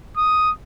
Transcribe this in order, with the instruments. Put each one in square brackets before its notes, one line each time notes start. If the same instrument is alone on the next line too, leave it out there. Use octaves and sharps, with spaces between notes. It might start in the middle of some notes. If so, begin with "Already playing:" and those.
[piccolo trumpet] D#6